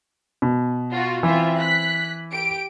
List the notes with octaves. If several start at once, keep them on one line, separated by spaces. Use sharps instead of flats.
B2
F4 F#4
E3 C4 F4 E5
F#6 B6
G4 D7